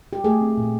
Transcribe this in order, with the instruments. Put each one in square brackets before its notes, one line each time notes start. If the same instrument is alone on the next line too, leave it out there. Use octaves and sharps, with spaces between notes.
[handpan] G4
A3 G#4
C4
A#2